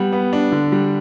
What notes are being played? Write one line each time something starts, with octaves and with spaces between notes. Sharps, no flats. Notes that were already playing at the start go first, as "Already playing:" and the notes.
Already playing: G3 B3 F#5
B3
D4
D3
G3